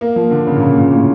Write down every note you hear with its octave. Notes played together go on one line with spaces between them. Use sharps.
A#3
F3
D3
C#3
A#2
C#3
A#2
A2